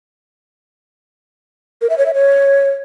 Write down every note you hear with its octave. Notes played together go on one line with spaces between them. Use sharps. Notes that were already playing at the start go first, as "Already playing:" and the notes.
A#4
E5
C#5
E5
C#5